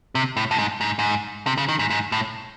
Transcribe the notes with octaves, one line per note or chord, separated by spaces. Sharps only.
C3
A2
A2
G#2
G#2
G#2
C3
C#3
D#3
G#2
G#2
A2